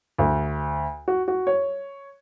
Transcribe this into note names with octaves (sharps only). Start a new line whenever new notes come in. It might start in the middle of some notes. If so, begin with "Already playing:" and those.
D2
F#4
F#4
C#5